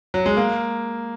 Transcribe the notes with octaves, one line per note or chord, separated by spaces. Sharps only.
F#3
G#3
A#3